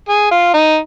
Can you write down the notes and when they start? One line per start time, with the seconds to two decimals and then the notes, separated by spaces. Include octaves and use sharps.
0.09 G#4
0.31 F4
0.54 D#4